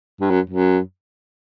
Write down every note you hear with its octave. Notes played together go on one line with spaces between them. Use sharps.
G2
F#2
F#2